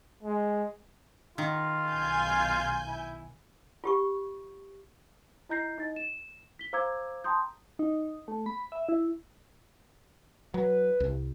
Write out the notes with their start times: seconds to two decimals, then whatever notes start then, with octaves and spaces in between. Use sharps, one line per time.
0.23 G#3
1.38 D#3 F4
1.89 B1 G#5 G6
2.88 E4
3.84 F4 G4 C#6
5.49 E4 D#5 A#5 G6 A#6 C7
5.78 D#4 D#5 A6
5.96 E7
6.59 B6 G7
6.73 C5 F5 A#5 D6 E6 G#6
7.24 G5 A5 A#5 C6 D#6 G6
7.79 D#4
8.28 A3
8.46 B5
8.72 E5
8.89 E4
10.54 F#3 B4
11.00 C2